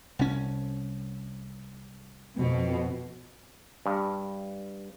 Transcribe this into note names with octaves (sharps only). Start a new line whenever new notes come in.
C2 C#4
F2 B2
G2